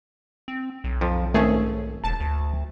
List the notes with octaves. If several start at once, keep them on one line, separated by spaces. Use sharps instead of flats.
C4
B1
F2 F3
G#1 A3 C#4 G#4 C#5
E1 A5
D2